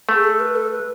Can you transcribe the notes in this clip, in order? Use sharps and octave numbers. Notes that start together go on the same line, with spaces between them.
A3
G#4
A4
B4
A4
B4